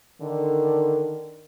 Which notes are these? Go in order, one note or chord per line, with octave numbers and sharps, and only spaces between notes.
D3 D#3